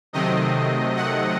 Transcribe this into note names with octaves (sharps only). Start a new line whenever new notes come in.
C3 D#3 F#3 A3 C4 D#5
F#5